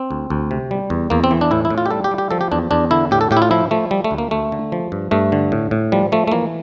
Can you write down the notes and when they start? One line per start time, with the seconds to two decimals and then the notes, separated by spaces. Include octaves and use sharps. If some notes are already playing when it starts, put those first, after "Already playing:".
Already playing: C4
0.11 D2
0.30 D2
0.51 C3
0.71 G3
0.90 E2
1.10 E2 A#3
1.24 C4
1.31 E3
1.41 D4
1.51 A2 E4
1.65 E4
1.70 A2
1.78 F4
1.86 G4
1.90 G3 A4
2.04 G4
2.11 G3
2.18 G4
2.31 F3 A4
2.41 G4
2.52 E2 D4
2.71 E2 D4
2.91 D3 E4
3.11 A2 G4
3.21 A4
3.31 A2 G4
3.37 E4
3.42 F4
3.51 F3 E4
3.71 F3 A3
3.91 G3
4.04 A3
4.11 D2
4.18 A#3
4.31 D2 A3
4.52 D3
4.72 F3
4.92 G2
5.11 G2 A3
5.32 D3
5.52 A2
5.71 A2
5.92 F3 G3
6.12 F3 A3
6.28 A3
6.32 E3 A#3